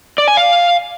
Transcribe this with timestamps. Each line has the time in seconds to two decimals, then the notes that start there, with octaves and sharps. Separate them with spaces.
0.18 D5
0.28 G#5
0.37 F5